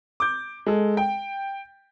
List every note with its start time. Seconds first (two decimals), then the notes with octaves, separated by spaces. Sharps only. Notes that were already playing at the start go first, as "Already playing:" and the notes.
0.20 D6 G6
0.66 G#3 A4
0.97 G5